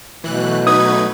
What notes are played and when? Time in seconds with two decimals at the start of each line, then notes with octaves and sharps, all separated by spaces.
0.24 B2 E3 F#3 A3 F#6
0.67 D#4 B4 D#6 G#6